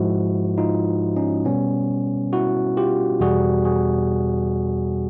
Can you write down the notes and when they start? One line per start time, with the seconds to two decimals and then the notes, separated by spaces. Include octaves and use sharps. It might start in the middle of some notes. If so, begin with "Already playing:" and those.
Already playing: G#2 F3 G#3 E4 F#4
0.58 D#4 F4
1.16 C#4 D#4
1.45 B2 G3 B3 C#4
2.33 E4 F#4
2.77 F4 G4
3.20 E2 B2 G3 F#4 G#4
3.65 F#4 G#4